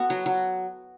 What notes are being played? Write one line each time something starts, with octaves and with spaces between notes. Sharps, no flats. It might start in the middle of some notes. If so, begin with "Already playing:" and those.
Already playing: B3 F#4 A4
F#3
F#3